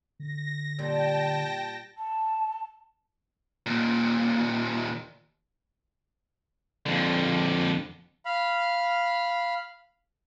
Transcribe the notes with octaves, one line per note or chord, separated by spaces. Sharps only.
D3 A#6
A#2 G3 G5 A5 A#6
A5
D#2 A#2
F2 D3
F5 B5